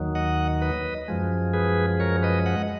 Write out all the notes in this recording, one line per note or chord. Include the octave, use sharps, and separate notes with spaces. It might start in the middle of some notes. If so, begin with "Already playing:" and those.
Already playing: D#2 D#3 F#3
D#5 F#5
B4 D#5
F#2 F3 G#3
G#4 B4
A#4 C#5
B4 D#5
D#5 F#5